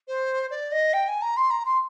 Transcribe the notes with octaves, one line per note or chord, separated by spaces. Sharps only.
C5
D5
D#5
G5
G#5
A#5
C6
A#5
C6